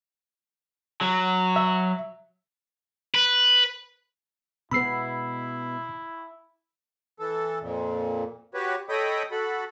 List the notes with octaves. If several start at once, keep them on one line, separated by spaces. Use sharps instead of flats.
F#3
E5
B4
B2 G#3 B3 E4 B5 E6 C7
E3 A4
F2 A#2
F#4 G4 B4 C#5
A4 C#5 D#5 G5 B5 D#6
F#4 A4 B5